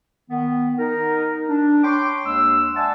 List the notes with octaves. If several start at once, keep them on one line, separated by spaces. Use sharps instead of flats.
D#3 B3
D#4 A#4
D4
C#5 G5 B5 C6 D6
D#2 G#3 A#3 D4 C6 E6
D5 E5 F#5 G#5 A5